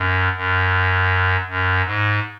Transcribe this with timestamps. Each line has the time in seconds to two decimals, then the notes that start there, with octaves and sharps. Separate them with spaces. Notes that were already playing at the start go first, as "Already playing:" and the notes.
Already playing: F#2
0.36 F#2
1.48 F#2
1.85 G#2